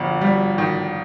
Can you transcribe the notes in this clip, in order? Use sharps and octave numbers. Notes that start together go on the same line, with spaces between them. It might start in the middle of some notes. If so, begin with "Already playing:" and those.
Already playing: G1 F2
G3
D#3